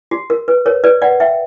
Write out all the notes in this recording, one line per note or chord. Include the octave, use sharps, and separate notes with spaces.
F#4
A#4
B4
A#4 C#5
B4 D5
D5 F#5
E5 G5